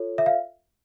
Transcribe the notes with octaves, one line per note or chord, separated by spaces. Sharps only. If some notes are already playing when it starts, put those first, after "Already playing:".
Already playing: F4 A4 C#5
E5
F5